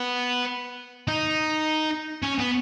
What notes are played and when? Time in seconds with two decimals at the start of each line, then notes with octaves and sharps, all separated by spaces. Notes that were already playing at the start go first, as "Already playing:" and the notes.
Already playing: B3
1.08 D#4
2.23 C#4
2.39 B3